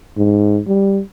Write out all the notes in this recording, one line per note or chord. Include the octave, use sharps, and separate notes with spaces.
G#2
G3